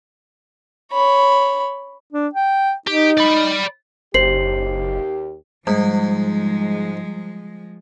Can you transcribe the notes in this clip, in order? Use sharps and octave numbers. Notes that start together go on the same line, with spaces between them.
C#5 B5
D4
G5
D#4 G4
D5 B5
F#1 D#2 G4 C5 C7 F#7
G#2 F3 G3 G#3